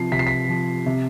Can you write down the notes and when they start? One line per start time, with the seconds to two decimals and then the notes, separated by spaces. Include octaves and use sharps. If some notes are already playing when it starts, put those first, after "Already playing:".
Already playing: C3 F3 C7
0.12 C3 B6
0.19 C7
0.27 B6
0.49 F3
0.86 C3